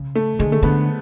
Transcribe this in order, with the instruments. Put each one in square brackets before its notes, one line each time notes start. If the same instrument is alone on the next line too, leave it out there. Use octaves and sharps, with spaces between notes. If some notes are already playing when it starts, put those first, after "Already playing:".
Already playing: [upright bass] C#3
[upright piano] A3
[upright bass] D3 [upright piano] G#3
[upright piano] A3
[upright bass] D3 [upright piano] B3